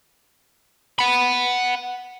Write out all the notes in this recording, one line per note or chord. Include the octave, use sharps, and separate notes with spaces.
F#5 B5